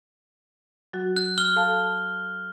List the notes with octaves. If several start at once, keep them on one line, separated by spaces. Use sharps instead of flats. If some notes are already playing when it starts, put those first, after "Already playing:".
F#3 F#4
F#6
F6 G7
A4 F5 A5